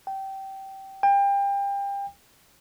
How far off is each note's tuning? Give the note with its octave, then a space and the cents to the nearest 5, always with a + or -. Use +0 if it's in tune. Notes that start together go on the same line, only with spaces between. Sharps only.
G5 -20
G5 +30